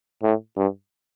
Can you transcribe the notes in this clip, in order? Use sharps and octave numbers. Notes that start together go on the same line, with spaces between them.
A2
G2